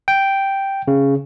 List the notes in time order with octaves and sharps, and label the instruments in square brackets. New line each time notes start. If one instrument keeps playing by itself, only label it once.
[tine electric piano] G5
C#3